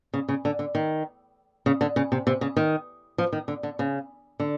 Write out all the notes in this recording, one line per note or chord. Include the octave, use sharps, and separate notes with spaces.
C#3
C#3
D3
D3
D#3
C#3
D3
C#3
C3
C3
C#3
D#3
F3
D#3
D3
D3
C#3
D3